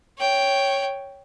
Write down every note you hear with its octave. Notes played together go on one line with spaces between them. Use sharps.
C#5 G5